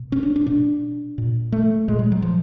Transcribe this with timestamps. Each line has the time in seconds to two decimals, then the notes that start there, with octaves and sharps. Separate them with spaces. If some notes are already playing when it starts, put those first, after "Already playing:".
Already playing: B2
0.12 C#4
0.23 D4
0.36 D4
0.46 B2 D4
1.18 A#2
1.52 A3
1.88 A#2 G#3
1.99 G3
2.12 F#3
2.22 F3